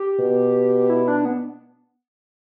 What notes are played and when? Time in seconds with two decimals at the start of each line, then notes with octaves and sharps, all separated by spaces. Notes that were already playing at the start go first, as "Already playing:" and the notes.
Already playing: G4
0.19 B2
0.90 E4
1.08 D4
1.25 B3